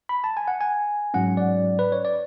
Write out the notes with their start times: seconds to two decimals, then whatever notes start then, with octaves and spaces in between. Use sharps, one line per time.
0.09 B5
0.24 A5
0.37 G#5
0.48 F#5
0.61 G#5
1.14 G#2 F#3 C#4 F#5
1.37 D5
1.79 B4
1.92 C#5
2.05 D5